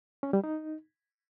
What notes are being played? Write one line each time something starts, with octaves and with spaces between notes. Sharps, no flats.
C#4
G3
D#4